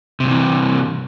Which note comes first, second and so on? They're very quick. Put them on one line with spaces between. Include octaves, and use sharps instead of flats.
C3 G2 D#3 E3